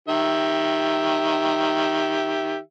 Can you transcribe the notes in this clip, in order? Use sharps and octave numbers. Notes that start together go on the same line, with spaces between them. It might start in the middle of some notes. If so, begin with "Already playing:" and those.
D#3 G4 E5